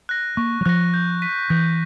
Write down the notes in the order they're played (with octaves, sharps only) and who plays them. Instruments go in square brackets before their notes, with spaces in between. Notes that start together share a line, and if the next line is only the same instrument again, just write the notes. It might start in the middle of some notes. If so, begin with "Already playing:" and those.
[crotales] F#6 A#6
[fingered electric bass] A#3 [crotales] C#6
[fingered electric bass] F#3
[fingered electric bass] F3 [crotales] F#6 A#6
[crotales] G6
B6 D#7
[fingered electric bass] E3 [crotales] G6